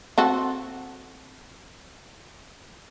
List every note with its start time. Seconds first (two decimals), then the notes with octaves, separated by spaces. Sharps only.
0.18 C4 F#4 A4